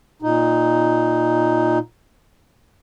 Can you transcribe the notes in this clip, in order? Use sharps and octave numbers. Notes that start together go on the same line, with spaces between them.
A#2 D#4